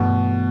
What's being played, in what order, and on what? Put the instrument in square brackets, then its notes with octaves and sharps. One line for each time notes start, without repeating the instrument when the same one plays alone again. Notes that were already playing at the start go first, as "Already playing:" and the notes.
Already playing: [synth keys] G2 E3 A3 [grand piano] B2